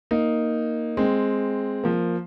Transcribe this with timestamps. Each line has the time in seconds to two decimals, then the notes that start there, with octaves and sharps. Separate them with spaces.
0.11 A#3 D#4
0.97 G#3 C4
1.84 F3 A#3